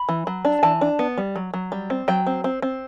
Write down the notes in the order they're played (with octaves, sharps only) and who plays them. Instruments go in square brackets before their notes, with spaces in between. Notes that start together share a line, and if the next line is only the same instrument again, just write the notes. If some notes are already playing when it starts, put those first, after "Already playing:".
Already playing: [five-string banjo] B5
E3
F#3
D4
E3 A5
D4
B3
G3
F#3
F#3
G3
C4
F#3 G5
C4
C4
C4